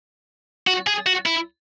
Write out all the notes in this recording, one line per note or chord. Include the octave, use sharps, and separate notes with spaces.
F#4
G#4
F#4
E4